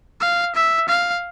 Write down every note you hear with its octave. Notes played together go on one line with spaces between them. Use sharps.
F5
E5
F5